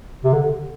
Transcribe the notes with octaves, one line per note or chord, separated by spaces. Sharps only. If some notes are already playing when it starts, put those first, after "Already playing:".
C3
D3